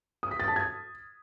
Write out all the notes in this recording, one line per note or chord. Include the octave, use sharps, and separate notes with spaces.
D#6
B6
A6
A5
G#6